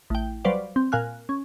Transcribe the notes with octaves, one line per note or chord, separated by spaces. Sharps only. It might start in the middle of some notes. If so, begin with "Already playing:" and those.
A1 G5
F#3 G3 B4 C5 D5 F5
C4
A#2 A#4 F5 G#5 F6 F#6
C#4